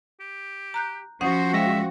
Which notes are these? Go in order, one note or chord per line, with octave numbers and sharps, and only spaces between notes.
G4
A#5 F#6 G6
F3 C#4 F#4 C5 F#5 D#6
G#3 E5 F5 G5 A#6